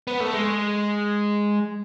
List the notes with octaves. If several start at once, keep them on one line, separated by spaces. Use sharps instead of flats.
B3
A3
G#3